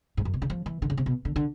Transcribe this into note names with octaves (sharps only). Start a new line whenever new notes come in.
G#2
F#2
B2
C#3
F3
E3
D3
C#3
C3
B2
D3
D3